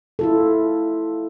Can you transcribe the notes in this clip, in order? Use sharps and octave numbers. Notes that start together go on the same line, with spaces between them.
E4 F4 A4